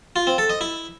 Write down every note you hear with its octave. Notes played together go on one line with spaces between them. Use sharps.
F4
C4
A4
D#5
E4